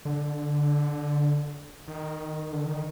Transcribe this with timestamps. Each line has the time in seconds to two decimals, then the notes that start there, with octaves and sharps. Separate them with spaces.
0.05 D3
1.88 D#3
2.53 D3
2.66 D#3